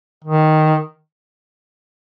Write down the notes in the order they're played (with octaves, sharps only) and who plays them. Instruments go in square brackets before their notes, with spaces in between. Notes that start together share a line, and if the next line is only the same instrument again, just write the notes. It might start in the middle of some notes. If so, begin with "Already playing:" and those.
[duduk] D#3